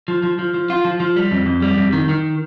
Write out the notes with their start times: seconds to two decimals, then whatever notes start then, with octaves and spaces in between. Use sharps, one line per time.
0.08 F3
0.23 F3
0.39 F3
0.54 F3
0.70 F4
0.85 F3
1.00 F3
1.16 G3
1.31 F2
1.46 F2
1.62 G3
1.77 F2
1.93 D#3
2.09 D#3